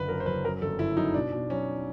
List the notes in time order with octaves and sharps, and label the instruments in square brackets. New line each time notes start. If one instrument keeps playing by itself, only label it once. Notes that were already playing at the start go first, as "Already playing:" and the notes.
Already playing: [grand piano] F#1 D3 B4
F#2 A#4
C5
F#1 B4
F#2 A#4
G1 A4
G1 E4
F#2 D#4
B2 D4
B2
F#3 C#4